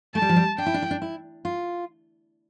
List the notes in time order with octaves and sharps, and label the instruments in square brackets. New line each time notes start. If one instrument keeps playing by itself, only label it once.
[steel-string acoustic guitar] A3 [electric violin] A5
[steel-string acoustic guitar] G3
F3
G3
[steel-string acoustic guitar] D4 [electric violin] G5
[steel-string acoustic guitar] E4
D4
E4
D4
E4
F4